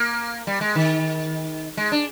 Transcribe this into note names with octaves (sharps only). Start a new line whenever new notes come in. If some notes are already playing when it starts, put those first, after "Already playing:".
Already playing: A#3
G3
G#3
D#3
G#3
D4